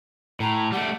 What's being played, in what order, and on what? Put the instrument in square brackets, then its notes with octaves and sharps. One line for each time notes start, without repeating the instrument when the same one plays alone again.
[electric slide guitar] A2 [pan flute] A#5
[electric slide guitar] G3 A3 [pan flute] F#5